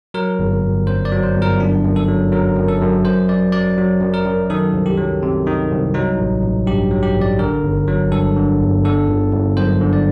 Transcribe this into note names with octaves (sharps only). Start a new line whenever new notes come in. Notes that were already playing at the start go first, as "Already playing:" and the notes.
F#3 A#4
G1
G1
F#2 C5
D5
F#3
C5
G1
A#4
F#2 D4
F#2
A4
F#3
F#3 A#4
F#2
A4
F#2
F#2 C5
F#2 D5
F#3 D5
F#3
F#2
A#4
F#2
D#3 A4
C2
G4
F#3
C3
D#3
C2
F#3 D#4
A1
A1
G2 G4
F#3
G4
A1
D5
D3 A#4
G1
F#3
G2 A4
D3
G1
D3 A4
G1
G1
F#2 C5
D3
D5